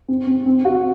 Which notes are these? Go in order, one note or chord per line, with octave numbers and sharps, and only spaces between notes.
C4
C4
C4
F#4